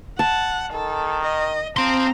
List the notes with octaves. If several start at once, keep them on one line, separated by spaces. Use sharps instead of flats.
F#5 A5
D#3 A4
D#5
F3 C4 A#5 C6